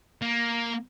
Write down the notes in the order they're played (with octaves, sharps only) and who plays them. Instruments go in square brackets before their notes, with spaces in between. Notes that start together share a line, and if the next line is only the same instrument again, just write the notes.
[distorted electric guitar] A#3